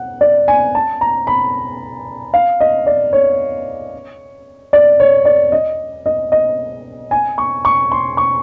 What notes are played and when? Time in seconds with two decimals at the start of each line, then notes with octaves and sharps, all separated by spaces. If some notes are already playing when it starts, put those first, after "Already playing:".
Already playing: F#5
0.21 D5
0.48 G#5
0.75 A5
1.01 A#5
1.27 B5
2.34 F5
2.60 D#5
2.86 D5
3.13 C#5
4.73 D5
5.00 C#5
5.25 D5
5.52 D#5
6.06 D#5
6.32 D#5
7.11 G#5
7.38 C#6
7.65 C#6
7.92 C6
8.17 C#6